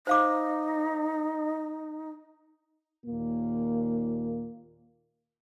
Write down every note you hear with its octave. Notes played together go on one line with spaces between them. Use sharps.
D#4 C5 F5 D6
D#2 A#2 A#3